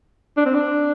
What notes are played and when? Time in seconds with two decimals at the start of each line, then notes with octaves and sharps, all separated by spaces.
0.37 D4
0.46 C4
0.54 D4